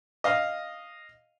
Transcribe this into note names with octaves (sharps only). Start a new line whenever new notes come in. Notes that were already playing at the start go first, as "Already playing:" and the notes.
D#5 F5